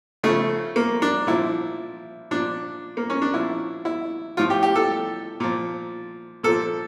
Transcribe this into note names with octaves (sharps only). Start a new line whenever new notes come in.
C#3 F3 A3
A#3
D4
A#2 F3 E4
A#2 F3 D4
A#3
C#4
D4
A#2 F3 E4
E4
A2 F3 F4
G4
G4
A4
A#2 F3
A#2 F3 A4